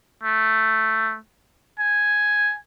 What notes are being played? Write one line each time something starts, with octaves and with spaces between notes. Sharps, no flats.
A3
G#5